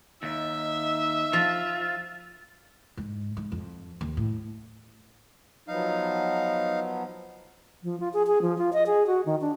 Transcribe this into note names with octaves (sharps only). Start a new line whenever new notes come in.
D#2 D#4 E5
F3 F4
G#2
G#2
F2
D#2
A2
F3 F#3 B3 D#4 F5
F3
F4
G#4
G#4
F3
F4
D#5
G#4
F#4
D#3
D4